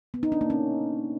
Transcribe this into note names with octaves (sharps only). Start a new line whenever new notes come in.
B3
D#4
D4
A#3
C#4